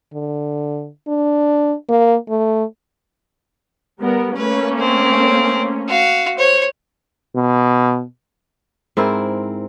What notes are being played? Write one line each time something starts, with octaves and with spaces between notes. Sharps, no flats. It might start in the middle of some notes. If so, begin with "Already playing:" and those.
D3
D4
A#3
A3
G3 B3 A#4
A3 A#3 C#4 B4
C4
F#4 F5
C5 C#5
B2
G#2 C4 E4 A#4